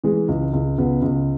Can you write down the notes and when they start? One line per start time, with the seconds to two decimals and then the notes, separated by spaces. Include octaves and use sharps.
0.04 E3 G#3
0.28 C#2
0.53 C#2
0.78 C#2 B3
1.02 C#2